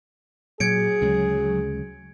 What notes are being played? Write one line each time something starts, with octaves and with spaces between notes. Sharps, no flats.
A#2 F#3 G#4 G#6 C#7 D7
D2 C#3 G#3